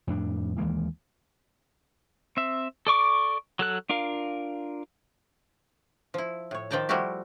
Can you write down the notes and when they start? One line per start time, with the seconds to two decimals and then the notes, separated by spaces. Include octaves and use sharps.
0.07 F2 A2 D4
0.58 D#2 E3 G#3 A#3
2.37 C4 E5
2.87 A4 D5 C#6 D6
3.59 F#3 A4 F#6
3.90 D4 F4 A#4 F5
6.14 F3 E4
6.51 A2 C#5
6.71 D#3 F3 D5 G5 A5 A#5
6.89 F3 G3 A3 E4 F#4 G4